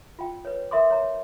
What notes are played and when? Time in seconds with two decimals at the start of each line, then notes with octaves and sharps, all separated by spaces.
0.19 F4 G5
0.45 B4 C#5
0.71 A#4 E5 C6 D6
0.91 C#5 A#5